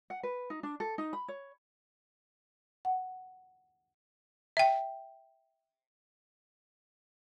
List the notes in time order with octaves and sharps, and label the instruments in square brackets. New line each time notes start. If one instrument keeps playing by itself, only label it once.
[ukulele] F#5
B4
D#4
D4
A4
D#4
B5
C#5
[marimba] F#5
[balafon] E5 G5